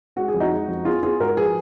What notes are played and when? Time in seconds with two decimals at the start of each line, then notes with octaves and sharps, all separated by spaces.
0.16 G#3 F#4
0.28 G#4
0.34 F2
0.40 D#4 F#4
0.51 G#3
0.68 F2
0.85 B3 F4 G#4
1.03 B3 F4 G#4
1.20 G#2 F#4 A#4
1.37 F3 G#4 B4